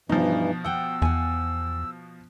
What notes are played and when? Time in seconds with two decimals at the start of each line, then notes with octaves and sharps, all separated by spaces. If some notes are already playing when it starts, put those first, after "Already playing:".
0.09 G2 B2 E3 F3 D#4
0.64 F#5 G5 E6
1.02 E2 F#5 G#5